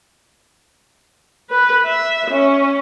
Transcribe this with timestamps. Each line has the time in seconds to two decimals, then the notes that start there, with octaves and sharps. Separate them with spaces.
1.50 B4
1.86 E5
2.30 C#4